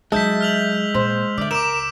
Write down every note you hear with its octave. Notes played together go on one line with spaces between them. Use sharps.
F#3 G#3 D#4 E5 A5 E6 G6 B6
F6 F7 F#7
A#2 C5
D3 D5 E5
C#2 A#4 D6 D7 E7